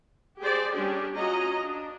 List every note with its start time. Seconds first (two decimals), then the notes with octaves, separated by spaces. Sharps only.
0.41 G4 G#4 C5 D5
0.73 G3 C#4 D4 G4 G#4
1.16 C#4 F4 F#4 D#5 A#5
1.64 D4